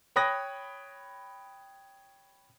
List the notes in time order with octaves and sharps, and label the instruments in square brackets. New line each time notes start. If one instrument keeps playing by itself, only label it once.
[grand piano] C#5 G5 B5 D#6 F#6 A#6